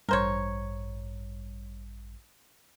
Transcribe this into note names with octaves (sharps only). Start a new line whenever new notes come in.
A1 G2 A#4 C5 C#5